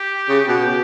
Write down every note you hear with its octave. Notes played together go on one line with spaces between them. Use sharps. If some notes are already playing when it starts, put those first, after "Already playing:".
Already playing: G4
C#3
B2 G4